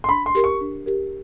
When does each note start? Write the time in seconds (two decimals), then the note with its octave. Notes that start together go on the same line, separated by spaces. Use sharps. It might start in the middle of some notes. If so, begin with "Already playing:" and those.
0.04 C6
0.09 D4 B5
0.26 C6
0.35 G4 A#4
0.44 C#6
0.61 D4
0.86 G4 A#4